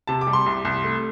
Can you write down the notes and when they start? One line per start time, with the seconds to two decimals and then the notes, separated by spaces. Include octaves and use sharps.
0.07 C3 A5
0.21 D6
0.27 G3
0.33 C6
0.46 C2
0.65 C2
0.84 A3